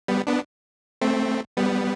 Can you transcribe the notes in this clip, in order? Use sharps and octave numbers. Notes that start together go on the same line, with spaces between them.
G3 B3
B3 D4
A3 C4
G3 B3